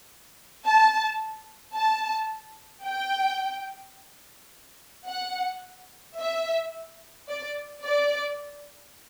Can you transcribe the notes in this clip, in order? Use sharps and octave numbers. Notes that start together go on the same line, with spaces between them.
A5
A5
G5
F#5
E5
D5
D5